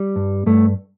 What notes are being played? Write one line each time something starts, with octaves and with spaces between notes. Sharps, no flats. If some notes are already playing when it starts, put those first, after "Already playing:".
Already playing: G3
G2
G2 A3